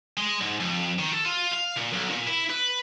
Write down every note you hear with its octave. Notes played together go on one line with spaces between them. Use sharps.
G#3
G#2
F2
D#3
A4
F4
F5
A#2
B1
A#2
E4
B4